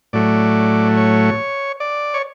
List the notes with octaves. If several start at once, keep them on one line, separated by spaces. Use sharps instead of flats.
A2 F#3 A3 D5
C#5
D5
C#5